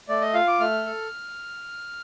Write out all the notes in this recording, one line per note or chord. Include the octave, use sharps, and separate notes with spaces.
A3 D5
D#5
F4 F5
D6
A3 F6
A4